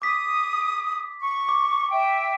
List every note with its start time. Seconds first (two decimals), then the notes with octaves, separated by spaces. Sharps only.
0.02 D6 D#6 B6
1.20 C#6
1.49 D6
1.91 E5 G5